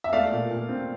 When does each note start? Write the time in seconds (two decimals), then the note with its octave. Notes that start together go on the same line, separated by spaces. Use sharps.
0.04 E5
0.13 A3 D5 F5
0.32 A#2
0.51 A#2
0.69 C4